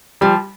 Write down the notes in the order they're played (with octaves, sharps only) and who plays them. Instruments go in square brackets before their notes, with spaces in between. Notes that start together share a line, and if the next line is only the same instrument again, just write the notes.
[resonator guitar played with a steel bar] F3 [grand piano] G3